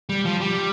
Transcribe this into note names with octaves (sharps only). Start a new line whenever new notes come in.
G3
F3
G3